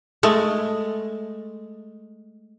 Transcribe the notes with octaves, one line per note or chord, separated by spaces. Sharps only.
G#3 A3